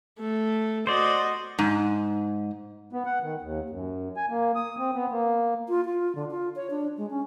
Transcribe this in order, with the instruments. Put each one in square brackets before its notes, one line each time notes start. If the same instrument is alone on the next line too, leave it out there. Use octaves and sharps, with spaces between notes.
[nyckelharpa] A3
[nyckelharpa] F#4 D#5 [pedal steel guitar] C5 D5
[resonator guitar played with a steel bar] G#2
[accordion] B3
F#5
D#3
D#2
F#2
G#5
A#3
D#6
C4
B3
A#3
[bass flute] F4
F4
D3
F4
C#5
D4
G#3
C#4